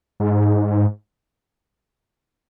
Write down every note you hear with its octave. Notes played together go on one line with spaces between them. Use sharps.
G#2